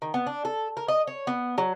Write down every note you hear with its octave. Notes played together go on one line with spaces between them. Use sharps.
D#3
B3
D4
A4
A#4
D#5
C#5
B3
F#3